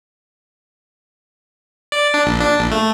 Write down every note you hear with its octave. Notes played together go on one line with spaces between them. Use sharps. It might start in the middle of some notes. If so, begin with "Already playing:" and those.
D5
D4
A#1
D4
A#1
A3